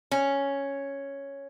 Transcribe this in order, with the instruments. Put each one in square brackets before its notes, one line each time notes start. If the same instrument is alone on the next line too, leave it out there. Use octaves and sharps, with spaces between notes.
[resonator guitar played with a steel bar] C#4